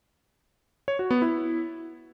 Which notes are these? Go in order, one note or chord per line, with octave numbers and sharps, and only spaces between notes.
C#5
F#4
B3
E4